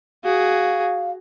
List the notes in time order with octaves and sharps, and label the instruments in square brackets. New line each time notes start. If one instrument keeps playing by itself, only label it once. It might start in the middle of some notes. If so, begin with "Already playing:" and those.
[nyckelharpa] F#4 G#4 [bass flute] F5